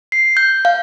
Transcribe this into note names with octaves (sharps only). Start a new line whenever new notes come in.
C7
G6
F5